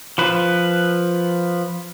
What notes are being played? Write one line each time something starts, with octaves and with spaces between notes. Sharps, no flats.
F3 B4